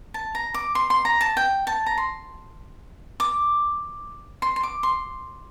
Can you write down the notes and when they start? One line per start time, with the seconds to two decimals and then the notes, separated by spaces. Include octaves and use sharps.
0.14 A5
0.35 A#5
0.54 D6
0.75 C6
0.90 C6
1.05 A#5
1.21 A5
1.37 G5
1.67 A5
1.86 A#5
1.98 C6
3.20 D6
4.42 C6
4.56 C6
4.63 D6
4.83 C6